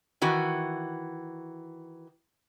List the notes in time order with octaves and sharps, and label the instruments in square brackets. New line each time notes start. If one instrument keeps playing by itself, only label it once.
[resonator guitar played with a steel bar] D#3 E3 F#4